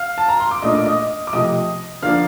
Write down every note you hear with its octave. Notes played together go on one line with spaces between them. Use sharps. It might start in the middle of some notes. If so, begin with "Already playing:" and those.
Already playing: F5 F6
A5
A#5
C6
D6
A#2 A3 D4 D#5 D#6
D6
D#5 D#6
D6
C3 F3 A3 D#5 D#6
D3 F3 A#3 D4 F5 F6